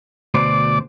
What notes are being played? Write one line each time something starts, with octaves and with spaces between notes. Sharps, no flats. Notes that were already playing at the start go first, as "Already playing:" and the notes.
D2 B2 C5 D5